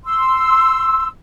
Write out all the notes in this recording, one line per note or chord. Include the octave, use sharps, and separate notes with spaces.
C6 E6